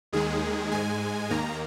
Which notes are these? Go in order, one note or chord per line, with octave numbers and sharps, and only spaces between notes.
D#2 D#3 G#3 G#4
G#2 G#3 G#5
D#2 D#3 A#3 A#5